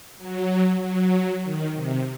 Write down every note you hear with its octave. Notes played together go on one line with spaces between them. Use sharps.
F#3
F#3
D#3
C3